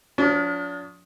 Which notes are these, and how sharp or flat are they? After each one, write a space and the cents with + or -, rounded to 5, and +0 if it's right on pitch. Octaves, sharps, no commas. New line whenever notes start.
F3 +35 D4 -40